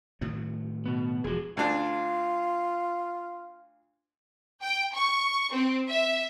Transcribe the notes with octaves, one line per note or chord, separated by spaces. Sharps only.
A2 D#3 F#3
B2 B3
E1 F3 F#4 G#4
D2 D4 F4 A5
G5
C#6
C4
E5